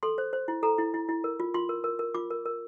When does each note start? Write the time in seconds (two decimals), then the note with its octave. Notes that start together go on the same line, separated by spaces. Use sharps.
0.03 A4 C6
0.18 C5
0.33 C5
0.48 E4
0.63 A4 A#5
0.78 E4
0.94 E4
1.09 E4
1.24 A#4
1.40 F4
1.54 F4 C6
1.69 A#4
1.84 A#4
1.99 A#4
2.15 F4 D6
2.30 A#4
2.45 A#4